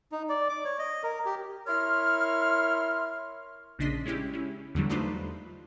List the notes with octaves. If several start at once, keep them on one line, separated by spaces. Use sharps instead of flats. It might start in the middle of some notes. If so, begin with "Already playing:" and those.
D#4
D5
D6
C#5
D#5
A#4
G4
E4 A#4 C#5 C6 F6
A#1 C#3 D4 D#5 C6 B6
G#3 C#4 E4 G4
C#4 E4
E2 D3 F#3 G3
A3 D4 D#4 F4 B4 C5